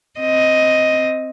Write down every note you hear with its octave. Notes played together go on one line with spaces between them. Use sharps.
C4 D#5